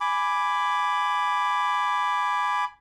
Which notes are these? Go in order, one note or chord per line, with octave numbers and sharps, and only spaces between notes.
G#5 B5 D6